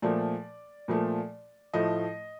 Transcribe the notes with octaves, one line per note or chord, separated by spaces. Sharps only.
A#2 F3 A3 D5
A#2 F3 A3
A2 F3 A3 D#5